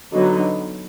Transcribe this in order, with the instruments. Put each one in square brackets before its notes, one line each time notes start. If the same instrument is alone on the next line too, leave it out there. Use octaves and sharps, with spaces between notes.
[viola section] D3 F#3 B3 D#4